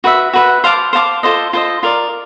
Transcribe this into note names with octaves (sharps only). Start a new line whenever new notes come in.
F#4 B4 E5
F#4 B4 E5
C5 F5 A5 D6
C5 F5 A5 D6
F4 A4 C5 D#5
F4 A4 C5 D#5
F4 A#4 D5